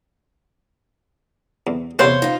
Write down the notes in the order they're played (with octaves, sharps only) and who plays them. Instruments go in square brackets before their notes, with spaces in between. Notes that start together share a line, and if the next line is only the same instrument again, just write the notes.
[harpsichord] E2
[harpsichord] E2 C3 C4 [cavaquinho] C5 F5 C6 [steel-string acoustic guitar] C#5
[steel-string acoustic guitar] D#4 F4